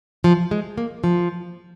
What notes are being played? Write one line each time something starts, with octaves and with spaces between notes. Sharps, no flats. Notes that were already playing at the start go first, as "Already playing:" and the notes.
F3
G#3
A#3
F3